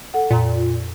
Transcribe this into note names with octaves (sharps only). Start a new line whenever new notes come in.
A4 F#5
F2 A#2 A#5